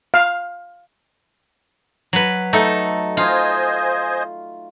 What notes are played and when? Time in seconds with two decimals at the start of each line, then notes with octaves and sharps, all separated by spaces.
0.14 F5
2.13 F#3 B4
2.53 A3 D#4 A4
3.17 F4 C5 D#5 G#5